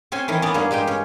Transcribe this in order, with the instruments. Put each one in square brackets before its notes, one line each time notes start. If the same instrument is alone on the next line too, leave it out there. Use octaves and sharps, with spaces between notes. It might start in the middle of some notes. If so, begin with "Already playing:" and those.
[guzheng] C4 C#4 C5 G#5
D#3 E3 C#4
B3 C#4 D5 D#5
G2 A#3 C#4 G#4
G2 G#3 G4 G5
C#4